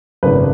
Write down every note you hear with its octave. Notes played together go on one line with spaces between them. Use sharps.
G#1 F#2 C#3 F#3 A3 B4